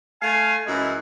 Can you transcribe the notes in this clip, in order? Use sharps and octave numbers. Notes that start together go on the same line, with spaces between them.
A3 F5 G#5
F#2 E3 G#3 E4